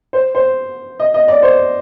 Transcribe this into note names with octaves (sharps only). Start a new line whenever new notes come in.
C5
C5
D#5
D#5
D5
C5